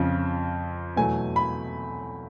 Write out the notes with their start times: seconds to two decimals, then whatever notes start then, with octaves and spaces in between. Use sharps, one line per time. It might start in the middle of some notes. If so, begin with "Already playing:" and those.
Already playing: F2 C#3 F3
0.97 E2 B2 F#3 A3 G#5
1.36 B5